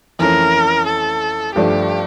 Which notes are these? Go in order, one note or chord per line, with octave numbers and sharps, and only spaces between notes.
F2 E3 A3 C#4 A#4
A4
G2 F3 A3 D4 G4